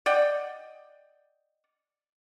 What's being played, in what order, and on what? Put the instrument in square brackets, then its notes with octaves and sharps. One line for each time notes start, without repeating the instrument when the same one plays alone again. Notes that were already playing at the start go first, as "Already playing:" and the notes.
[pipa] D5 D#5 F#5 G5